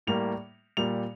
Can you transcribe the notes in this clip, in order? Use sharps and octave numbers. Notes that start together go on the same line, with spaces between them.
A2 G3 A#3 F7
A#2 G3 A#3 F7